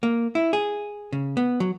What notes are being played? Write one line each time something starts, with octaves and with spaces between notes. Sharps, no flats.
A#3
E4
G#4
C#3
B3
F#3